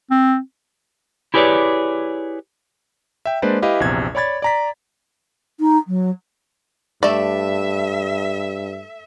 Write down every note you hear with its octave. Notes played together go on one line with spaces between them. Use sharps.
C4
E4 G4 G#4 B4 C#5 D5
E5 G5
G#3 A#3 D4 B4 C5 D5
E4 G4 B4 D#5 F5
A#1 E2 C3 G#6
C#5 D5 B5 G#6 A6
D5 A#5 B6
D#4
F#3
G2 A3 D5 E5